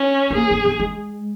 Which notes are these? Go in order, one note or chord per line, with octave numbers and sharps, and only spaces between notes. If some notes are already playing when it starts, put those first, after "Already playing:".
Already playing: C#4
B3
A#3 G#4
C#4
B3
G#3